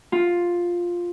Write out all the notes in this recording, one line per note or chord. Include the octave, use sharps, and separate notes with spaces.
F4